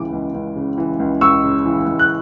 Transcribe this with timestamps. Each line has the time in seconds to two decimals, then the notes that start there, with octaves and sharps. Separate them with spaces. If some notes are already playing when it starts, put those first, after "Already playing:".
Already playing: C#2 C#3 E3 D6
0.13 C#2
0.34 C#2
0.56 C#3
0.78 E3
1.00 C#2
1.21 C#2 C#6 E6
1.43 C#3
1.65 E3
1.87 C#2
1.99 F#6